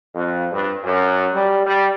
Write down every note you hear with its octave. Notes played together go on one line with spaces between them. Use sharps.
F2
G2
F#2
G3
G3